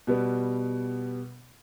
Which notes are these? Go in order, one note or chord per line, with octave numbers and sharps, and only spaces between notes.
B2 G3 B3